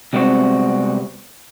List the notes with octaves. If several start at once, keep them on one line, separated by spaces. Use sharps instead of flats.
C3 G3 G#3 B3 C4 F#4